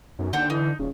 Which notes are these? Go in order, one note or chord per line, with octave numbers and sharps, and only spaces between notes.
B1 F#2
D#2 D3 C5 F#5 G5
E3 D#4
D#1 C#3